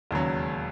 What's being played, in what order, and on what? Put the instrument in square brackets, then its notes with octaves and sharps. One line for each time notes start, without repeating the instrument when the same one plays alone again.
[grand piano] E1 D#2 C#3 F#3